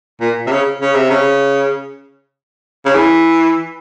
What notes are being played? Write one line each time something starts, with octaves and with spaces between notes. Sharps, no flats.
A#2
C3
C#3
C#3
C3
C#3
C#3
E3